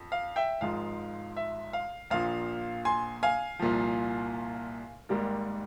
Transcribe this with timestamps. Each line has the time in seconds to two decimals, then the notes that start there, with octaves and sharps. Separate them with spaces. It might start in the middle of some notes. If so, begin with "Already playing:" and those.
Already playing: F2
0.12 F5
0.36 E5 G5
0.61 G#1 G#2 F3 G#3 F5
1.37 E5
1.73 F5
2.10 A#1 A#2 F3 F5
2.85 G#5 C6
3.23 F5 G#5
3.59 C2 A#2 F3
5.09 G#1 G#2 G3 A#3